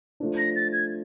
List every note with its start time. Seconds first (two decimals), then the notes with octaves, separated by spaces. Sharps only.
0.20 F3 A3 D4
0.38 A#6
0.56 A6
0.73 G#6